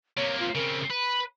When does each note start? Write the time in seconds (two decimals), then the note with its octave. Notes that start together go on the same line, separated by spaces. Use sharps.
0.17 C3 A#3 C#5
0.40 F4
0.55 C#3 C4 A#4
0.91 B4 B5